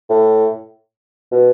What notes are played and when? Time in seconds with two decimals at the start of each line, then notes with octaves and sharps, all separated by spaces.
0.09 A2
1.32 B2